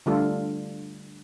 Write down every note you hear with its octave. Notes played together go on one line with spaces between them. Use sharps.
D3 G3 A3 D4 F4 A4